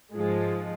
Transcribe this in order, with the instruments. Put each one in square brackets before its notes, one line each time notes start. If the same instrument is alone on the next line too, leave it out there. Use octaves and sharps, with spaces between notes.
[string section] G#2 F3 G#3